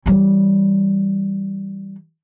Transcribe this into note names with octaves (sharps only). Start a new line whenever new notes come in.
E3 G3